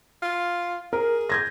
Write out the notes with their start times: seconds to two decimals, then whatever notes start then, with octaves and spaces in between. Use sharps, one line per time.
0.22 F4
0.93 G#4 A#4
1.29 G6 G#6 A#6